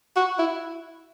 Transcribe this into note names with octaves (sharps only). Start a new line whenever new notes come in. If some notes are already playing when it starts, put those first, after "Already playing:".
F#4
E4